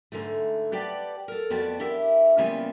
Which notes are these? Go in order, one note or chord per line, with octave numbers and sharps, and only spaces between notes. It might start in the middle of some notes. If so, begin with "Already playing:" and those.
G#2 D3 E3 A3
G4 B4 D5 F#5 G5 A5
A4 A#4
F2 B3 F#4 D5 G5 A5
D4 E4 G4 A#4 E5
C#3 E3 G3 A#3 B3 F4